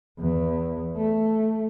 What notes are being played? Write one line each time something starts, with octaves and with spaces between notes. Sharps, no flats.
E2
A3